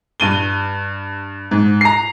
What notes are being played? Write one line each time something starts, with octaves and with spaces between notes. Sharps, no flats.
G2 D#7 G7
G#2
A#5 C7